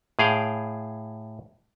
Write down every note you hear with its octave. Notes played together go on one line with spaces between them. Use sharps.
A2 G#4 F5 G5